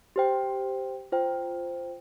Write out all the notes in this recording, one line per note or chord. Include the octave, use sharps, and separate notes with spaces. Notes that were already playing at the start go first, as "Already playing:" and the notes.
G4 C5 G5
F4 C5 G5